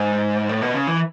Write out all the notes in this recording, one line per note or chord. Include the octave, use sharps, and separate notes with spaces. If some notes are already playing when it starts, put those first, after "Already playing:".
Already playing: G#2
A2
B2
C#3
E3